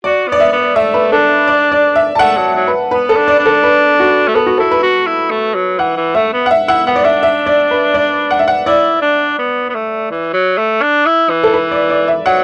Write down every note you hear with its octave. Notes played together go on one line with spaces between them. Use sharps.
F#4 D5
B3 D5
E5
B3
A3 E5
B4
D4 A4
D5
D5
E5
A5
A3 F#5
F#3
F#3
B4
B3 B4
A4
D4
D5
D4
A4
B4
F#4
A3
B3 A4
F#4
E4 A4
B4
F#4
E4
A3
F#3
E3 F#5
E3
A3 E5
B3
F#5
E5
E4 F#5
B3 F#5
D5
D4 E5
E5
D5
B4
D5
F#5
E5
F#5
E4 D5
D4
B3
B3
A3
E3
F#3
A3
D4
E4
E3
A4
B4
D5
D5
E5
F#3 F#5